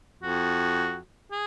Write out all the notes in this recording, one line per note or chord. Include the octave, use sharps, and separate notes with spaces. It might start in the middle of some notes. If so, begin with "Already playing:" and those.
F2 F#4
G#4